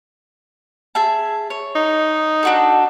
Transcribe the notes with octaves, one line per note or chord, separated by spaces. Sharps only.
G#4 E5 A5
C#5
D#4
D4 F#4 A4